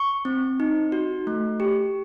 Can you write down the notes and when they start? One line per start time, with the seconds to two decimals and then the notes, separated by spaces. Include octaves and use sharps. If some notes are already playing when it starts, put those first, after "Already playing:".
Already playing: C#6
0.25 C4
0.60 D#4
0.92 F#4
1.27 A3
1.60 G4